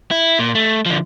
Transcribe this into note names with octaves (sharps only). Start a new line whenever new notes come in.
E4
A#2
A3
D3 F3